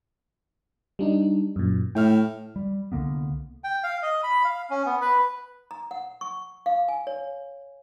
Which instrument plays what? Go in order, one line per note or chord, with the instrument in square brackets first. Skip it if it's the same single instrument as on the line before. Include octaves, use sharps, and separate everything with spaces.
[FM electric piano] G3 D4 D#4
F#2 A#2
[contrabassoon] A2 [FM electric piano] G5 F6
[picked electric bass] G3
C2 D3 A#3 B3
[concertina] G5
F5
D#5
B5
F5
C#4
B3
B4
[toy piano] A#5
F#5
C#6
F5
G#5
C#5